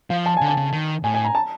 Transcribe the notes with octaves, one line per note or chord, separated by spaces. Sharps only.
F3 F5
A5
D3 G#5
A5
C#3
D#3
A2 G#5
G#5
A#5
A5